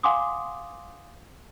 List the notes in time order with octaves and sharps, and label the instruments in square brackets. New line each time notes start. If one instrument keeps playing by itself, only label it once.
[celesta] F5 F#5 G#5 C6 D6 D#6